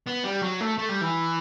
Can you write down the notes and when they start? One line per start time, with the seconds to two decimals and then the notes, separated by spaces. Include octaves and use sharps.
0.07 B3
0.24 G3
0.42 F#3
0.61 A3
0.78 A3
0.89 G3
1.02 E3